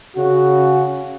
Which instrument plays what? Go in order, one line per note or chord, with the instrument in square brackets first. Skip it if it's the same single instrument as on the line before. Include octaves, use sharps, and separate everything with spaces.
[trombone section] C#3 F#4